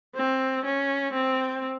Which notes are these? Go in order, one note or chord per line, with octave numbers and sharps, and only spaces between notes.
C4
C#4
C4